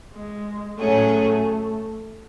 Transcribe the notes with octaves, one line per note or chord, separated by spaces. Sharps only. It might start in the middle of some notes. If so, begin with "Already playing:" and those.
G#3
A2 F#3 A3 C#4 G#4